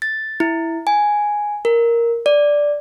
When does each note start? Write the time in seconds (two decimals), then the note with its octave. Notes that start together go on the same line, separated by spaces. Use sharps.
0.02 A6
0.40 E4
0.87 G#5
1.65 A#4
2.26 D5